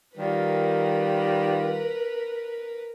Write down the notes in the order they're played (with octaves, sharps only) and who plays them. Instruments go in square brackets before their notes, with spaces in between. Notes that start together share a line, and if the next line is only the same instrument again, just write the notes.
[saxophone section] D#3 G3 F4 [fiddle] A#4 B4